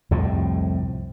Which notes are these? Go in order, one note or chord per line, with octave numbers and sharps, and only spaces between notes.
C2 F2 A2 C3